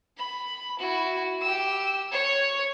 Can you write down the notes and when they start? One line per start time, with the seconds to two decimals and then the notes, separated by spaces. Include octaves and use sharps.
0.17 B5
0.79 E4 F#4
1.42 G4 E6
2.12 C#5